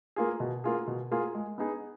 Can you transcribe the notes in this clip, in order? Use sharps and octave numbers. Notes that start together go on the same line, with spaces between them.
A#3 F4 G#4
B2
A#3 F4 G#4
B2
A#3 F4 G#4
G#3
B3 D#4 G#4